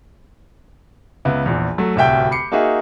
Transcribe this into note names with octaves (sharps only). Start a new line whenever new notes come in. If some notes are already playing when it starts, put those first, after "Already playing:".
C#2 B3 E5
A#1 E2
F#3 A3
D1 C2 F#4 E5 G5 G6
B5 D6 C7 C#7
A#3 D#4 F#4 G#4 E5